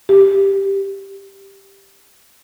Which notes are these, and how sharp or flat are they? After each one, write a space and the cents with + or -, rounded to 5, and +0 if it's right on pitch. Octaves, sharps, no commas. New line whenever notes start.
G4 +0